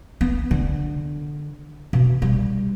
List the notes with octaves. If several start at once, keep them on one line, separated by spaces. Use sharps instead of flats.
B3
D3
B2
G3